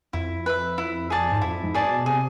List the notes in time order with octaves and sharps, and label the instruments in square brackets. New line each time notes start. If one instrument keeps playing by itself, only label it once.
[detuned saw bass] F2 [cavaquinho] E4
[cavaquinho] B4 E5
E4
G#4 D5 A5
[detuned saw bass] G#2
[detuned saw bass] F2 [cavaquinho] E4
[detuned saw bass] G#2
[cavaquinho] G#4 D5 A5
[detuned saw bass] B2
[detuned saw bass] C3 [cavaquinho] G#4